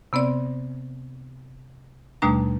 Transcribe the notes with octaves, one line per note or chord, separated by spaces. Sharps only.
C3 B3 C4 D5
D#2 B2 G3 A3 D4 A#5